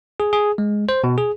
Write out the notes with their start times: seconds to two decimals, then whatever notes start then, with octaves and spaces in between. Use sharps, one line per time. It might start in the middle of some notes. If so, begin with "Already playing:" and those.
0.20 G#4
0.33 G#4
0.58 G#3
0.89 C5
1.04 B2
1.18 G#4